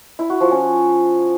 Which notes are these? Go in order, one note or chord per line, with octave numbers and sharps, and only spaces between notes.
E4
F#4
F3
C#4